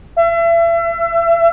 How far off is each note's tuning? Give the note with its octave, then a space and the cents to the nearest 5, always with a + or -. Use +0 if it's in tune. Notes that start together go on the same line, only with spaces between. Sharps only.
E5 +35